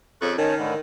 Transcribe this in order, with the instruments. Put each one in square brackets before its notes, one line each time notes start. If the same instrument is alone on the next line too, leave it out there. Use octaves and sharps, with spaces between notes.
[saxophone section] F2 C#3 A4 [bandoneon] C#6 F#6
[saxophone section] D#3 [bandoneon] C#4 C#5 A5
[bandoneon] A2 D3 E3